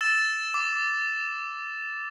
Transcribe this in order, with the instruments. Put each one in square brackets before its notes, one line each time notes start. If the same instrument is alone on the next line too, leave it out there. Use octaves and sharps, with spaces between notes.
[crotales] E6 A6 E7
D6